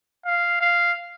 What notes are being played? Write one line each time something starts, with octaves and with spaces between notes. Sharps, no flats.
F5
F5